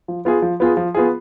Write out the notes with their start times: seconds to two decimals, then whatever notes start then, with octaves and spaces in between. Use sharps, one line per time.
0.08 F3
0.25 B3 F4 G#4
0.42 F3
0.60 B3 F4 G#4
0.77 F3
0.95 B3 F4 G#4